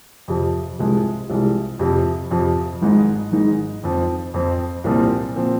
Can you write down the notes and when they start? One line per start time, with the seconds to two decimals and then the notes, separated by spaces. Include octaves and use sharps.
0.28 F2 C3 F3
0.78 C2 C3 F3 G#3
1.29 C2 C3 F3 G#3
1.79 F2 C3 F3
2.31 F2 C3 F3
2.82 G#1 G#2 G#3 D#4
3.32 G#1 G#2 G#3 D#4
3.83 F2 F3 C4
4.34 F2 F3 C4
4.84 C2 A#2 F3 C4
5.36 A#2 F3 C4